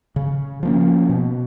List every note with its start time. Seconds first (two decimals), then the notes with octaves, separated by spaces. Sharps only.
0.16 C#3
0.63 F3 A#3 C#4
1.09 B2